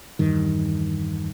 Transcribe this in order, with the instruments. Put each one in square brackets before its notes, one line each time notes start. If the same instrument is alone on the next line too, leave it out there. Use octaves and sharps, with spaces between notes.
[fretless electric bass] E2 G2 D#3